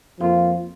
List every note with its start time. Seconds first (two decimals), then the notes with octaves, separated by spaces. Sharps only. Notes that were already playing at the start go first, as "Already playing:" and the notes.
0.19 F2 F3 A#3 F4